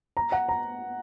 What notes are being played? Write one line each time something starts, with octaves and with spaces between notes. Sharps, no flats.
A#5
F#5
A#5